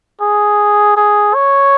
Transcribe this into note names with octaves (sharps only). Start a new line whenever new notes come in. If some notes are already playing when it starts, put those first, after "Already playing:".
G#4
G#4
C#5